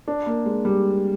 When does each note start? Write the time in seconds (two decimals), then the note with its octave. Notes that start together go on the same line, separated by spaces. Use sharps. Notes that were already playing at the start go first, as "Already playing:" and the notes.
0.08 D4
0.26 A#3
0.45 G#3
0.65 G3